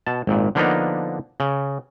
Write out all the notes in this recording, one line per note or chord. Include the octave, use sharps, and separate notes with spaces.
B2 A5
G#1 A#2
D3 F3 A#3 B3 D4 D#4
C#3